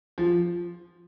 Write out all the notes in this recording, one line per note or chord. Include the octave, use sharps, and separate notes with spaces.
F3